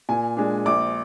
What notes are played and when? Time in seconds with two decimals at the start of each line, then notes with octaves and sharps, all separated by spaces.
0.09 A#2 G#5
0.37 G#3 D4
0.65 A#1 D6